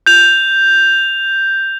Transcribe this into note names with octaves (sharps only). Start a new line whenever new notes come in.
G6 F7